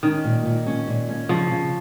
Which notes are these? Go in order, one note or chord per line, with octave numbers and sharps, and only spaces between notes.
D#3 C#4
A#2
A#2
C#4
A#2
C#4
C#3 F3
C#3